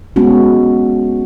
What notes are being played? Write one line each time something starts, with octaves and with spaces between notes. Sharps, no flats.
G#3 B3 C#4 F#4